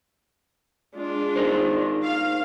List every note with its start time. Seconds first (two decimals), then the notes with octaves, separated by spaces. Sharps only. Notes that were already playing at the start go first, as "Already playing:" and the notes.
0.96 G#3 D4 F4
1.36 D#4 A#4 C5
2.05 F5